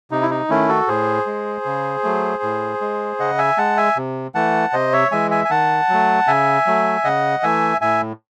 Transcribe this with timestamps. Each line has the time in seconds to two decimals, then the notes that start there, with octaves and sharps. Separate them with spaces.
0.11 C3 D#4
0.22 E4
0.30 D#4
0.50 D#3 A3 C#4 E4
0.69 F#4 A4
0.88 A2 G#4 C5
1.26 G#3
1.65 C#3
2.03 F#3 A3
2.43 A2
2.81 G#3
3.20 C#3 D#5 F#5
3.38 E5 G#5
3.58 G#3 F#5 A5
3.77 E5 G#5
3.96 C3
4.35 E3 A3 F#5 A5
4.73 C3 C5 D#5
4.93 C#5 E5
5.12 E3 G#3 E5 G#5
5.31 E5 G#5
5.45 G#5
5.50 D#3 F#5 A5
5.89 F#3 A3
6.27 C#3 E5 G#5
6.66 F#3 A3
7.04 C#3 D#5 F#5
7.43 E3 A3 E5 G#5
7.81 A2 E5 G#5